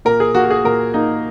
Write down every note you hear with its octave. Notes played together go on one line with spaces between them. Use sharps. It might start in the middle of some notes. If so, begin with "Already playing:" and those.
A#2 A#4
G#4
A#3 F#4
F#4
G#4
A#2 A#4
A#3 D#4